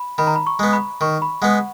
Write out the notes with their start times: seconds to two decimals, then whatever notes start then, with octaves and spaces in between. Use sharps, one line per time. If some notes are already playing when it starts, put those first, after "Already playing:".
Already playing: B5
0.18 D#3 B5
0.27 A#5
0.36 B5
0.47 C#6
0.59 G#3 B3
0.73 B5
1.01 D#3 C#6
1.22 B5
1.42 G#3 B3 F#5